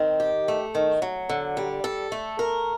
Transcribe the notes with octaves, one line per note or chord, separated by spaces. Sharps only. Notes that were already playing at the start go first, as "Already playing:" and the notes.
Already playing: D#3 C4
G4
A3
D#3
F#3
D3
G3
A4
A3
A#4